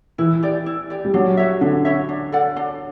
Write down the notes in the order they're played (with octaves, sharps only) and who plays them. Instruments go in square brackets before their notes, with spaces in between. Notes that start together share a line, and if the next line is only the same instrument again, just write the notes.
[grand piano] E3 [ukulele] E4
[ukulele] G4 D5
E4
G4 D5
[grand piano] G3
[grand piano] F#3 [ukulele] D4
[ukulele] F#4 C#5 E5
[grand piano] D3 [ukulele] D4
[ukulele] F#4 C#5 E5
D4
A4 D5 F#5
D4